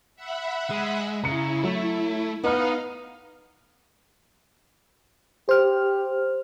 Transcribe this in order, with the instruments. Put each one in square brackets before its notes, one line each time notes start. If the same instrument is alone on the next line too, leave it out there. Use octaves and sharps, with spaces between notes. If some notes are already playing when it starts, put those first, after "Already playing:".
[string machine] E5 F#5 B5
[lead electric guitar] G#3
[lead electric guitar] C#3 [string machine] E4 [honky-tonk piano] A#5 C#7
[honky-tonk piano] F#3 [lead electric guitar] A3
[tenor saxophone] B3 [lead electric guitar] D#4 [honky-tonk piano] D#5 A#5 F6 [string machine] F5
[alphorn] G4 [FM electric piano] C5 F6